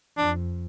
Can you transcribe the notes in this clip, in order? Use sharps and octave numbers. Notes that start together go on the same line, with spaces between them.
F2 D4